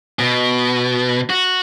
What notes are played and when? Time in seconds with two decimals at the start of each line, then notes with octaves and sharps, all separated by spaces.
0.19 B2
1.30 F#4